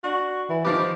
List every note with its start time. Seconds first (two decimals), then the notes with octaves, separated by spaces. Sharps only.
0.04 D4 F#4
0.49 E3
0.64 D#3 F3 G4 B4